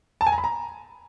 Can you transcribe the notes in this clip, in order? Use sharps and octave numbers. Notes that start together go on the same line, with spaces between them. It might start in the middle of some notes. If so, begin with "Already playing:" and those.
A5
G#5
A#5
B5
A#5